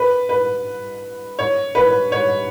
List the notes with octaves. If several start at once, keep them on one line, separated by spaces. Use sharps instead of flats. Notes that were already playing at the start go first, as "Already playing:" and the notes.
Already playing: B4
B4
C#5
B4
C#5